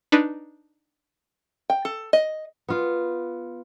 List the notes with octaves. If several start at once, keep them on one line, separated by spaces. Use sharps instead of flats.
D4 D#4 B4
G5
A4
D#5
B3 F4